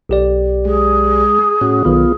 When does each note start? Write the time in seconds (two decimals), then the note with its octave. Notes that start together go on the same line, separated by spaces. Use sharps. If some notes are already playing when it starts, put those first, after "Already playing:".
0.09 B1 G4 D5
0.65 G#3 G#4
1.61 A2 C#4 F#4
1.85 B1 D#3 B3 F4